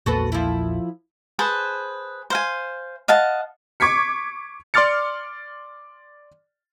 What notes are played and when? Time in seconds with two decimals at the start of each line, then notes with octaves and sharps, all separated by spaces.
0.06 A#1 E2 A#3 F#4 A4 B4
0.32 F3 E4
1.39 G#4 B4 C5 A5
2.30 C5 F5 G#5
3.08 D#5 F5 F#5 A5
3.80 C#6 D6 G#6 B6 C#7
4.74 D5 C6 D6 F6 A6 C#7